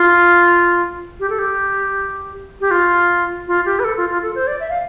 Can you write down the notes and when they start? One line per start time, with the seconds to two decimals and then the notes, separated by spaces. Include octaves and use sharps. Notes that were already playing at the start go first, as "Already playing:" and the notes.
Already playing: F4
1.20 G4
1.30 A4
1.39 G4
2.61 G4
2.71 F4
3.48 F4
3.66 G4
3.79 B4
3.84 A4
3.97 F4
4.09 F4
4.23 A4
4.35 C5
4.47 D5
4.60 E5
4.70 F5